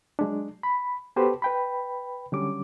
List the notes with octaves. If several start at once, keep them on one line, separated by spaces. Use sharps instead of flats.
F#3 G#3 D4
B5
B3 F#4 G4 A4 B4 C5
B4 G5 B5
D3 F#3 G3 C#4 D6